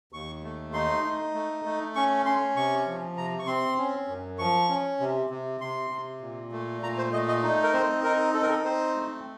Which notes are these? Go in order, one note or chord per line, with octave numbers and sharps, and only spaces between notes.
D#2 C#6
A3
D#4 C6
D#4
A3
A3
C#4 C#6
C#4 C6
C3 C#6
F3
C3 A#5
C#6
C4 C6
C#4
F#2
F3 C#6
C#4
C3
C3
C3 C6
C3
A#2
A3
A#2 A#5
C5
A3 D#5
D#5
D#4
A#4
C4 C5
D#4 A#4
D#4 A4
A#4
A4
C4 C5
A3